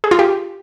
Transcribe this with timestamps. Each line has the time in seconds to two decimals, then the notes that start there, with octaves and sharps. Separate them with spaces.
0.04 G#4
0.11 F4
0.19 G4